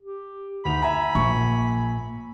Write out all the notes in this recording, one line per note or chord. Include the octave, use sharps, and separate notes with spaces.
G4
D2 D#4 B5 F7
E5 G#5 A#5
A#1 A#2 C#6